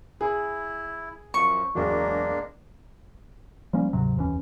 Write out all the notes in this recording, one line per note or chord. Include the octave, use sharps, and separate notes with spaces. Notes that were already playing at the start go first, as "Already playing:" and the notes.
E4 G#4
F#2 F3 C#6
E1 F#3 G#3 A#3 D4
F3 G3 A#3 C#4
D2 G#2 C3 F#3
F1 D#2 E3 C#4